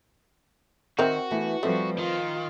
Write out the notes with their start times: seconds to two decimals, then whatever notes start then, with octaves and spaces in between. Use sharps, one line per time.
0.99 D#3 C4 F#4 A#4 E5
1.31 E3 A3 B3
1.63 F3 G3 A3 C4 B4 C5
1.98 D#3 F4